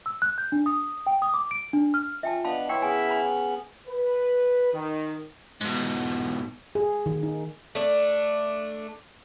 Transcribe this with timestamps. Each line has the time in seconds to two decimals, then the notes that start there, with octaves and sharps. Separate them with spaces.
0.06 E6
0.22 F#6
0.38 G6
0.52 D4
0.66 D#6
1.07 G5
1.22 D#6
1.34 D6
1.51 D7
1.73 D4
1.94 F6
2.23 C#4 F4 E5 G5 A5
2.45 B3 D4 D#5 F5 A5 B5
2.69 E4 B4 C#5 E5 F#5 G5 C6 C#6
2.82 B3 C#4 G#4 G#5
3.07 G#5 A#5 B5
3.87 B4
4.73 D#3
5.61 G#2 B2
6.75 G#4
7.06 D#3
7.23 D#4
7.75 A3 D4